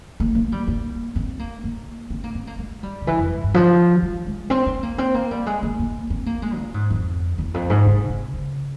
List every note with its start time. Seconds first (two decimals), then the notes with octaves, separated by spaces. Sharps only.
0.20 A#3
0.35 A#3
0.52 G3
0.67 A#3
1.16 C4
1.39 A#3
1.64 A#3
2.10 C4
2.24 A#3
2.35 C4
2.47 A#3
2.58 G#3
2.83 G3
3.02 C#3
3.07 E3
3.18 F2
3.31 G#2
3.43 G2
3.54 F3
4.02 G3
4.26 G#3
4.50 C4
4.66 C4
4.83 A#3
4.98 C4
5.14 A#3
5.31 G3
5.46 G#3
5.63 A#3
5.79 A#3
6.10 C4
6.26 A#3
6.42 G#3
6.58 A#2
6.74 G#2
6.90 F2
7.38 E2
7.54 F2
7.70 G#2
7.86 C3
8.09 C3
8.34 C#3